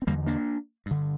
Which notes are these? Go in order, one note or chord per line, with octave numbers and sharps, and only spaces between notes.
C4
E2 D3 G3 A#3
A#3 D4
G2 D3